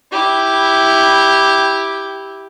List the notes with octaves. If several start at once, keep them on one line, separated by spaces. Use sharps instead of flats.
E4 G4